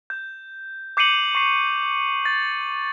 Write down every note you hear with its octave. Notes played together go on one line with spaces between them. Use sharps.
G6
D6 G6 C7 C#7 D#7 F#7
C#6 C7
A6